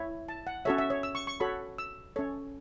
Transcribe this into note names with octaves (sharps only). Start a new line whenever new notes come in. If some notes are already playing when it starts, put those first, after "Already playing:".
Already playing: E4 C#5
A5
F#5
C#4 F#4 A4 C#5 E5
E5
C#5
E6
C#6
C#6
F#4 A4 C#5 B5
E6
C#4 A4 C#5